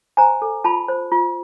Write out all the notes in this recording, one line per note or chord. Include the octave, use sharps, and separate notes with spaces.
C5 G#5 A#5
A4
F4 A5 B5
C5
F4